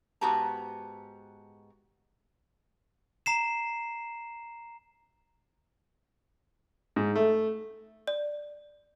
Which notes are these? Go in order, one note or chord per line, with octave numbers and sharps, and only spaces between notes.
G#2 B3 F#4 G4 A5 A#5
A#5 C7 E7
G#2
A3
D5